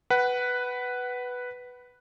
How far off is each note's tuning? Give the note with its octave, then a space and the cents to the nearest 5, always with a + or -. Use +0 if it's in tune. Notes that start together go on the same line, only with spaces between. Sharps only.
B4 +0 F#5 +20